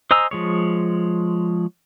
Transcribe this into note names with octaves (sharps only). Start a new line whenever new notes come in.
C5 D#5 G#5 A#5 E6
F3 G#3 C#5